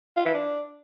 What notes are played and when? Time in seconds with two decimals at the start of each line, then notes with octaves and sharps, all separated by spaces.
0.17 F4
0.25 E3
0.34 D4